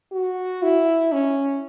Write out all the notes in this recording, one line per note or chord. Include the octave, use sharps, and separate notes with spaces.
F#4
E4
C#4